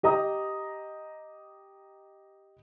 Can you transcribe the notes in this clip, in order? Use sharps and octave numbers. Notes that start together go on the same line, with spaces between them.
G4 D#5 A#5 D#6